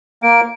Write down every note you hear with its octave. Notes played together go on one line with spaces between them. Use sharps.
A#3 D7